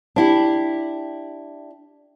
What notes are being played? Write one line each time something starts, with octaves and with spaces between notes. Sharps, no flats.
D4 E4 G4